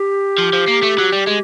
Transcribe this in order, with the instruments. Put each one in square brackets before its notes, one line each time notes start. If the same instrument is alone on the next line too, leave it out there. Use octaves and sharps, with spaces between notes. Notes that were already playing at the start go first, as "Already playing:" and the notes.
Already playing: [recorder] G4
[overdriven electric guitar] F3
F3
A#3
A3
F#3
G3
G#3